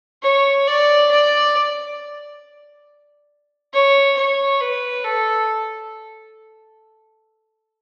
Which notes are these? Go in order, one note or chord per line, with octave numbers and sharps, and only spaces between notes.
C#5
D5
D5
C#5
C#5
B4
A4